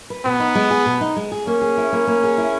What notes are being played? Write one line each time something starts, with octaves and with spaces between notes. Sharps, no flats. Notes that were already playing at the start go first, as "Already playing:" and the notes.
B4
B2 B3
D#4
G#3
G#4
B2
D#4
G#3
G#4
A#3 C#4
G#4
E4
A#3
A#3
G#4
E4